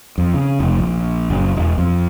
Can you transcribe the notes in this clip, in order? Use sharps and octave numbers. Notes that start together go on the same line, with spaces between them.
F2
C#3
F1
A#1
F#1
E1
F2